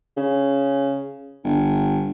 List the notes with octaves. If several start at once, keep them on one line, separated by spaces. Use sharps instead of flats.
C#3
G1